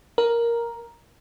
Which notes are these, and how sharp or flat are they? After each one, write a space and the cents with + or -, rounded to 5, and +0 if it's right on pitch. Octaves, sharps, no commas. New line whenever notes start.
A#4 +5